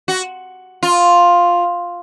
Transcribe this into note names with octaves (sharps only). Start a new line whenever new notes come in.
F#4
F4